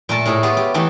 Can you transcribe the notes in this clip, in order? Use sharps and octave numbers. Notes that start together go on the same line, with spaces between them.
A#2 A3 A#4 A5
A2 A3 G#4 A4
B3 F4 G4 G#4 C#5
G4
E3 A3 D#4 G4